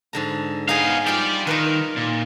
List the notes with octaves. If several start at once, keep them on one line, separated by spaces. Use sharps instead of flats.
G#2 D3 A#5
B3 D#4 G#4 F5
G3 F4 D5 G5
D#3 D#4 A#4 B4
A#2